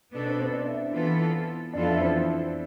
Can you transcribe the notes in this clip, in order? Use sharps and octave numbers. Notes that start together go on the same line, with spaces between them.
B2 B3 D4 A4
C4
C4
D4
E4
E3 B3 F4 A4
F2 E3 B3 D4 F4 A4
E4
C4